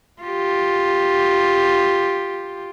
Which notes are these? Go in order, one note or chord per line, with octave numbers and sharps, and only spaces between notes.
F4 G4